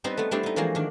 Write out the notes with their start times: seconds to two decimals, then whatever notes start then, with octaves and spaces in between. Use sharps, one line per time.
0.04 G3 B3 C4 D#4 B4
0.17 A3 B3
0.31 G3 A3 C4 D4 E4 G4
0.43 B3 D#4
0.56 E3 F3 G#3 A#3 F#4
0.75 D#3 D4